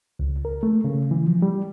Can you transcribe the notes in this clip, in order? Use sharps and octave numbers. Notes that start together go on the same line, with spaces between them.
C#2
A#4
A3
C#3
E3
F3
G3